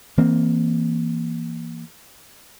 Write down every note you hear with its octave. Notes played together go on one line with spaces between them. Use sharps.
E3 A#3 C4